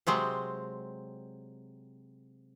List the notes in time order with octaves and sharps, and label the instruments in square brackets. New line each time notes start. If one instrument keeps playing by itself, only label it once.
[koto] C3 F#3 G#3 C4